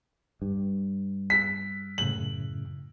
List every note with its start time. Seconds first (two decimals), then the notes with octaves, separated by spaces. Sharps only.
0.42 G2
1.30 B6
1.98 F#2 A2 C#3 F#7